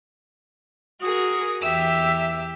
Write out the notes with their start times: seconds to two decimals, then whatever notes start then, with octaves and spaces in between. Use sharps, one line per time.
1.02 F#4 G#4 A#4 D#6
1.63 E2 G4 E5 E6